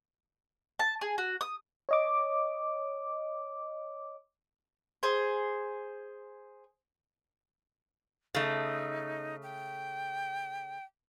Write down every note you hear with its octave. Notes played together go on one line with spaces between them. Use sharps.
A5
G#4
F#4
D#6
C#5 D#5 D6
G#4 C5
C#3 A3 D#4
G5